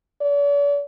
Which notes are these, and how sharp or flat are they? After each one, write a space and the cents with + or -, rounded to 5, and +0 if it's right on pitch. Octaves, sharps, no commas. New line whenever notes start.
D5 -45